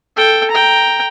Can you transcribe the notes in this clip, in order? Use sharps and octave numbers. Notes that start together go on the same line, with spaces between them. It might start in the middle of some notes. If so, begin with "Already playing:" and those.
A4 G5
G5 A#5